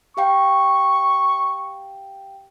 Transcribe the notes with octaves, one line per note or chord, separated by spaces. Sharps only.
G4 F5 G5 C#6